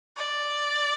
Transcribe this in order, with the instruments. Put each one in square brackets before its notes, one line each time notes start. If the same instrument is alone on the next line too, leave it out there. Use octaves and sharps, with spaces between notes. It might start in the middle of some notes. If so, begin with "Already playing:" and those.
[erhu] D5